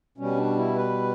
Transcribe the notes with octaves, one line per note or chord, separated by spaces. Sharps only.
B2 G3 C#4
D4
E4
B4